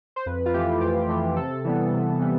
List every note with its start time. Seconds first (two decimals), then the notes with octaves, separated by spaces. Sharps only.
0.16 C5
0.26 F2 B4
0.46 F4
0.54 E3 A3 G4
0.81 F2 G4
1.09 E3 A3 G4
1.36 C3 A4
1.65 E3 G3 B3
1.93 C3
2.20 E3 G3 B3